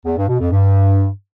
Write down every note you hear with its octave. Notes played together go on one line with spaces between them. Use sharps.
E2
G2
B2
F2
G2